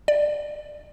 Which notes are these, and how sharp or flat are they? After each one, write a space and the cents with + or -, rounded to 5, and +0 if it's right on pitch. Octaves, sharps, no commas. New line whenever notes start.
D5 +5